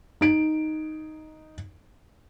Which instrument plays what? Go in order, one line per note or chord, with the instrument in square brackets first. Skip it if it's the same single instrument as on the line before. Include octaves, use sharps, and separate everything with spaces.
[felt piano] D#4 D7